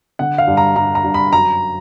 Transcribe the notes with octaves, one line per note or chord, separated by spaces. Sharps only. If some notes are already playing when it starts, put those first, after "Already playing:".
D3 F#5
F5
G2
A#5
G2 A#5
A#5
G2
B5
F#2 A#5